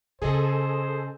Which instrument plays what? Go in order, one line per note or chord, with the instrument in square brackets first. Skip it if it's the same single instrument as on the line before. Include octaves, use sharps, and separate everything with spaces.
[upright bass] C#3 [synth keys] G#4 A4 D#5 [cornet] C5